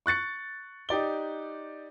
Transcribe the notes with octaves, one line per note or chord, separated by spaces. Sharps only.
C#6 F#6 A6 C#7
D#4 G4 D5 G7